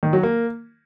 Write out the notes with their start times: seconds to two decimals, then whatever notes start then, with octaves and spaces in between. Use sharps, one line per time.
0.03 D#3
0.13 F#3
0.23 A#3